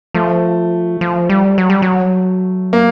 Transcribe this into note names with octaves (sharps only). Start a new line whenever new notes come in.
F3 A3
F3
G3
F#3
G3
F#3
A#3